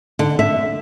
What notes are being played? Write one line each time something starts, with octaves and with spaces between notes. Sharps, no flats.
D3
E5